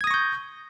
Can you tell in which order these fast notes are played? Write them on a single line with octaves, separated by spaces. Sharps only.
G#6 D#6 A#6 C#6 G6